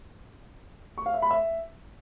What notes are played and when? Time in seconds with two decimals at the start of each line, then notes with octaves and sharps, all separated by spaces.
0.98 C#6
1.06 F5
1.14 E5
1.22 B5
1.31 E5